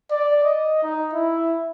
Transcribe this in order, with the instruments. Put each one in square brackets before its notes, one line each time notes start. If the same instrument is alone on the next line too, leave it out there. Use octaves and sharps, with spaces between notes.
[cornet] D5
D#5
D#4
E4